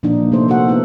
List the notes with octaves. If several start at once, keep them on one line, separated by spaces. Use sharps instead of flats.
A#2 F3 A#3 D4 D#4
C3 A3 A#3 A4 C5
A#3 F#4 A4 C5 F#5
B3 D#4 E4